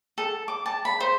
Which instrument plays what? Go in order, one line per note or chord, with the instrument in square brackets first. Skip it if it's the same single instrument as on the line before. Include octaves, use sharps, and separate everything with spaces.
[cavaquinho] A4
D6
A5
B5
C5